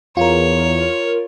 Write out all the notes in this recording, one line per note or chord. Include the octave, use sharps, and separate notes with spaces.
E2 F4 A#4 C#5